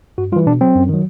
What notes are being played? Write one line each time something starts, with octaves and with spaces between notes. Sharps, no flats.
G2 F#4
E3 G3 F4
B2 D4
F#3 C4
F#2
D#3 F#3